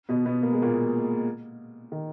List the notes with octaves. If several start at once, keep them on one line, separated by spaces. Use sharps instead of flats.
B2 B3
B2 B3
A#3
G#3
A#2 A#3
D#3